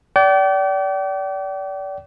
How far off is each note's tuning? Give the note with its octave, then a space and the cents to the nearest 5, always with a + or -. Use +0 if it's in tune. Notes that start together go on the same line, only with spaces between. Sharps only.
D5 -30 G5 -40